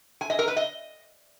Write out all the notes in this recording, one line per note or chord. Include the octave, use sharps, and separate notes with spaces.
G#5
D#5
A#4
B4
D#5